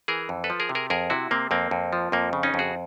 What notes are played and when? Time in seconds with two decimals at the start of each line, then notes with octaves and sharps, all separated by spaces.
0.08 E3 G#4 A#4
0.29 F2
0.44 A4 B4
0.50 F3
0.60 G#4 A#4
0.69 C3
0.75 G#4 A#4
0.90 F2 G#4 A#4
1.10 C3 E4 F#4
1.31 C3 A#3 C4
1.51 F2 A#3 C4
1.71 F2
1.93 F3
2.12 F2 A#3
2.33 C#3
2.43 C#4 D#4
2.54 F2
2.59 F#4 G#4